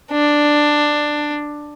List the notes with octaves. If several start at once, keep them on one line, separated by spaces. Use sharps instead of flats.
D4